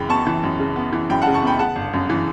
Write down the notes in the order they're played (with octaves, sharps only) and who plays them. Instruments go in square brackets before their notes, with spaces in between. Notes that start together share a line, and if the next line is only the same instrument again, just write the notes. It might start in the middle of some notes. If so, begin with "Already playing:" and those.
Already playing: [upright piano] F#2 C#3 E3 G5 B5
B3 A5 C#6
E3
F#2
C#3
B3
E3
F#2 G5 B5
F#5 A5
C#3
A5 C#6
B3 G5 B5
C#3 F#5 A5
G1
F#2
E3